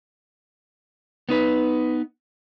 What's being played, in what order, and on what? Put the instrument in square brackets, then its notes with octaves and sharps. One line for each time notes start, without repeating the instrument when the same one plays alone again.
[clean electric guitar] B3 D#4 B4